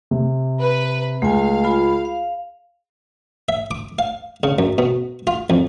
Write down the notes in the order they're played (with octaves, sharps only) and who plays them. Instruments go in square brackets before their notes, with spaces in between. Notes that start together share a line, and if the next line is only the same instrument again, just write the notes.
[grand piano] C3
[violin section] B4
[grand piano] C#2 [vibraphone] A3 G#5 [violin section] F5
[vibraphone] F4 B5
F5
[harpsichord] E5
D6
F5
C#3
F#2
B2
F4
F2